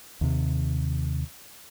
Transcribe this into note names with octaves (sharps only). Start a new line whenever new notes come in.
D#2 C3